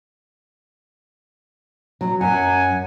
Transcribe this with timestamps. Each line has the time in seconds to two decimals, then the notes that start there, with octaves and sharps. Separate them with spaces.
2.01 F#3
2.21 F#2 F#5 G#5